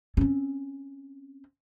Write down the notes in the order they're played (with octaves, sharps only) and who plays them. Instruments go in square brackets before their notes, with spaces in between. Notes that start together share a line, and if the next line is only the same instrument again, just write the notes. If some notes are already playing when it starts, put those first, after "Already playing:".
[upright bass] C4 C#4